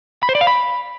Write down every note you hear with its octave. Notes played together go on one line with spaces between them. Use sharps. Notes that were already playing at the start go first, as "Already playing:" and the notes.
B5
C5
D5
F5
B5